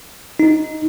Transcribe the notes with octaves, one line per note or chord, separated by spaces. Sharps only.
D#4